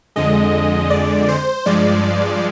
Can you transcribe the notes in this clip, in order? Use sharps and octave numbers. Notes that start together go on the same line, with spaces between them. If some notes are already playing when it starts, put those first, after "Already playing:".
F2 D3 G#3 D#5
D5
C5
G2 F3 G#3 D5